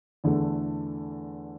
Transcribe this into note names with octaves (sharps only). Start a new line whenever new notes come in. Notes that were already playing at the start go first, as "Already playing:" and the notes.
E2 D3 A3